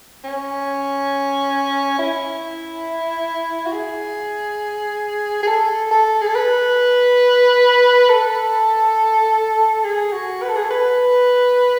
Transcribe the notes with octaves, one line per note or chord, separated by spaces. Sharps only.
C#4
E4
F#4
G#4
G#4
A4
A4
G#4
A4
B4
A4
G#4
F#4
B4
A4
G#4
A4
B4